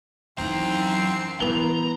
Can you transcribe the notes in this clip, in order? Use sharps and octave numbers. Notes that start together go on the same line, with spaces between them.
F#2 E3 C4 D#4 A#5
E3 B3 E4 A#5 F7 G7